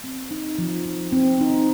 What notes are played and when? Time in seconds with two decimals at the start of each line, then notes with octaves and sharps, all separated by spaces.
0.04 C4
0.31 D#4
0.59 F3
0.86 F3
1.12 C4
1.41 D#4